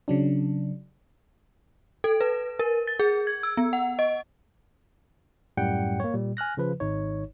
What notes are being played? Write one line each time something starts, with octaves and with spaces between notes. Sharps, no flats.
C#3 F#3 D4
A4
B4
A#4
A6
G#4
G#6
E6
B3
F#5
D#5
F#2 A2 G3 F#5 G5 C#7
A#3 C#5
A#2 G3
G#5 F6 F#6 A#6
C#3 F3 B4
G#1 D#4 C#5